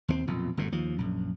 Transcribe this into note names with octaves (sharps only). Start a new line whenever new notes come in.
D#2 A3 C4
B1 F2 A#2
G1 F#2 A2
D#2 F3
A#1 F#2